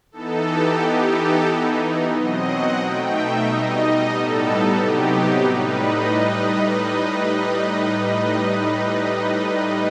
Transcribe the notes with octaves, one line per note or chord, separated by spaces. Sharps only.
E3 B3 D#4 A4
G4
E3 B3 D#4 G4
A4
E3 B3 D#4
B2 F#3 C4 D#5
F#5
B2 A3 D#4 G5
E5
B2 G3 D#4 D#5
D#5
A2 G3 B3 D#4 A4
C3 F#3 B3 D#4 G4
A2 G3 D#4 B4
D#5